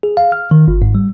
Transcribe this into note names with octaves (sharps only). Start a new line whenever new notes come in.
G#4
F5
F6
D#3
G1
G#2
G3